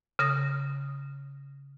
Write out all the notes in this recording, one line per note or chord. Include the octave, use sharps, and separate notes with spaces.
C#3 D#6 A#6